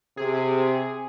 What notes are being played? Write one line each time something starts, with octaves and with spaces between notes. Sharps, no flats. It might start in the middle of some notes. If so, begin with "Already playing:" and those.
C3 G#4